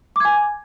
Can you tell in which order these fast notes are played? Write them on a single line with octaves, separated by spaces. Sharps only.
D6 G#6 G#5